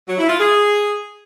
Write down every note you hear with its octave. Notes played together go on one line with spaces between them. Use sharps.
F#3
E4
F4
G#4